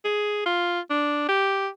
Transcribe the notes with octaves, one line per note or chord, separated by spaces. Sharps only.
G#4
F4
D4
G4